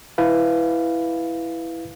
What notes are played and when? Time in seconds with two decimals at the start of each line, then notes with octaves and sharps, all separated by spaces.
0.18 E4 B4 F5